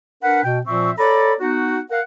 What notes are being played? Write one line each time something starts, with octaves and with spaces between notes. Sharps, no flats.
D4 A#4 B4 F#5
B2 G5
A#2 F3 C4 E5 C#6
A4 C#5 D5 A#5 B5
B3 D#4 F#4
A#4 F5 F#5